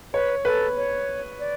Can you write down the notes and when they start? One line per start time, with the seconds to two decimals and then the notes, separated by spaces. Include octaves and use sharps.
0.13 B4 C#5
0.45 A4 B4
0.77 C#5
1.39 D5